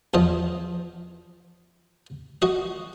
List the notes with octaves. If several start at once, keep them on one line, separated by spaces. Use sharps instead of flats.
E2 F3 D#5
F#4 D#5